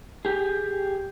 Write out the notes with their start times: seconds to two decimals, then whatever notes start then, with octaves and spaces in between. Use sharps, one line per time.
0.25 G4 G#4